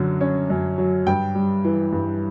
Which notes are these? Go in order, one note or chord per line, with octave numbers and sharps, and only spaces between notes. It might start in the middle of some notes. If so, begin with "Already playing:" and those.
Already playing: F#2 D3 F#3
C#4
F#2
F#3
G2 G5
G3
E3
G2